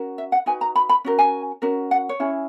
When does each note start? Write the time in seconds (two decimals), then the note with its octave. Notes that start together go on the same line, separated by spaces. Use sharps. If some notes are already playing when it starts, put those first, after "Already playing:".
Already playing: C#4 F#4 A#4
0.18 E5
0.32 F#5
0.46 D#4 F#4 B4 G#5
0.61 A#5
0.76 B5
0.89 B5
1.05 C#4 F#4 A#4
1.19 G#5
1.62 C#4 F#4 A#4
1.91 F#5
2.09 C#5
2.20 C#4 E4 G#4